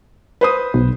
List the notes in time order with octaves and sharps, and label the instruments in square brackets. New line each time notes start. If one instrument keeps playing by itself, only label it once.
[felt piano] B4 C5 D#6
[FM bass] B1